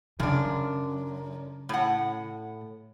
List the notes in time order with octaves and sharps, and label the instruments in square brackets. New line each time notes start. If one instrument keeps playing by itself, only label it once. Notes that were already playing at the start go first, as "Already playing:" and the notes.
[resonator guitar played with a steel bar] F#2 D4 [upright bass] C#3
[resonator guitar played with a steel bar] A2 F#5